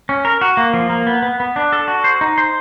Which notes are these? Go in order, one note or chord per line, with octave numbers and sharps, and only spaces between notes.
C#4
A#4
F#4
A#3
F3
A#3
B3
B3
B3
D4
A4
F#4
C5
D#4
C5